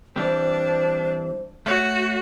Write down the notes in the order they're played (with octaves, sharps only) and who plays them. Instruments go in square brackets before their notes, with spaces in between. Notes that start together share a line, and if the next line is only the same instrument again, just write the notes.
[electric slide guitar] E3 G3 C4 [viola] D4 [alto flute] C5
[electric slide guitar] A3 C#5 [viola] F#4